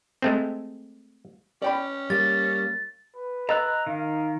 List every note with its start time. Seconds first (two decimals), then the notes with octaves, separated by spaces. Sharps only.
0.22 G#3 A3 C4
1.62 C#4 D5 G5 B5
2.10 G3 A#3 A6
3.15 B4
3.49 D#5 A#5 E6 F#6
3.87 D#3 F5